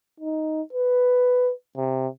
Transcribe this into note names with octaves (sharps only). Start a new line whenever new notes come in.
D#4
B4
C3